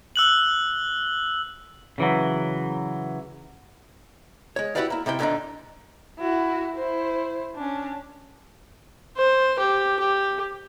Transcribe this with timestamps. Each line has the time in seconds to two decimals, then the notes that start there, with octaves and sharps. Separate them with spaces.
0.16 E6 F#6 F#7
1.98 C#3 E3 F#3
4.56 G#3 C#5
4.75 E4 F#4 G4 B4 D5 F5
4.90 A#3 E4
5.06 C3 D#3 E4 G5
5.19 D2 A#2 D3 G3 D4 D#4
6.19 E4 F#4
6.76 E4 C5
7.56 C#4 D4
9.17 C5
9.59 G4
9.99 G4